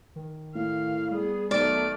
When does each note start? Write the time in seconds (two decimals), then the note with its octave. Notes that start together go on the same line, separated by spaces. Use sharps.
0.16 D#3
0.55 A2 F5
1.11 G3 B3 G#4
1.51 B1 D#3 A3 D5 F6